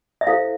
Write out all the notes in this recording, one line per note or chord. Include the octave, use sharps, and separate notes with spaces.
E5
E4 A4 C5 F5